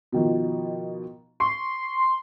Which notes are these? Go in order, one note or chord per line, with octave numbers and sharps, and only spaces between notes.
B2 D#3 F3
C6 C#6